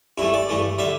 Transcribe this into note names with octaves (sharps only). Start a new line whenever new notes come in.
G2 E3 A3 E4
D5
G2 E3 A3
D3 G3 E5